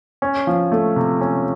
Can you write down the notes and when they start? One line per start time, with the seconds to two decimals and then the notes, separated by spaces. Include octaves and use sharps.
0.22 C#4
0.47 F3
0.72 A3
0.96 C3
1.21 C#4